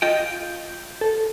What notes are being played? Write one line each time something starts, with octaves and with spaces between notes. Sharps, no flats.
F4 D#5 G5 G6
A4